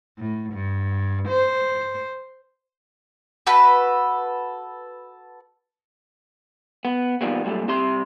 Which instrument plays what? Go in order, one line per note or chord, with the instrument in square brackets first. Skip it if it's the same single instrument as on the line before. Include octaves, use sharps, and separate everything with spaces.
[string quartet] A2
G2
C5
[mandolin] F#4 A4 B4
[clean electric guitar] B3
B2 D#3 F3 G3 A#3 B3
F#2 A#2 G3 A3
C2 C4 G4 E5 C6